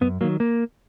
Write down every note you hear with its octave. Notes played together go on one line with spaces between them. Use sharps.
F#2 B3
D#3 F#3 A#3
A#3